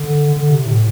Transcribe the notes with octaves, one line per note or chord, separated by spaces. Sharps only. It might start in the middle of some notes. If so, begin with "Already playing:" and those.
Already playing: D3
D3
C3
A2